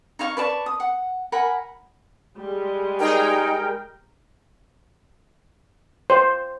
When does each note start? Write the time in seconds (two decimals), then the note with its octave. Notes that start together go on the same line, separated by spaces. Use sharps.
0.19 D#4 C#5 F5 C#6
0.37 B4 D5 A5 C#6
0.66 D#6
0.80 F#5
1.32 A#4 F#5 G#5 B5
2.37 G3 G#3
3.00 D#4 G#4 A#4 G5
6.10 C5